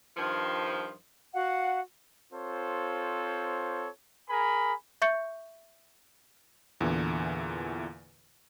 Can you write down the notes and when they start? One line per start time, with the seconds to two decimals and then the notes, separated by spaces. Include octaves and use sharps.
0.16 G2 D#3 F3
1.32 F#4 F5 F#5
2.33 C4 F4 A4 C5 C#5
4.30 G#4 A#4 G#5 B5
5.02 E5 C#6 G6 C#7
6.81 E2 A#2 D3 E3